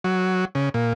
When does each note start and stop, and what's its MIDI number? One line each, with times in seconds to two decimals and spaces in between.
0.04 0.45 54
0.55 0.69 49
0.74 0.93 46